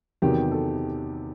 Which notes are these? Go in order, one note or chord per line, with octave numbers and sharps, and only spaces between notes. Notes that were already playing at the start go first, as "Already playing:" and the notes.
E2 C3 D#3 F#3 G4
A4